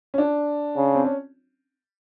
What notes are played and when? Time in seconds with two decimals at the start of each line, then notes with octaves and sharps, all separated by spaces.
0.14 C#4
0.18 D4
0.76 C#3
0.95 C4
1.04 C#4